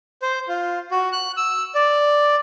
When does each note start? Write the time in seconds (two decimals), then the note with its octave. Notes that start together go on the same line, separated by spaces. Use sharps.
0.22 C5
0.48 F4
0.91 F#4
1.12 F#6
1.37 E6
1.75 D5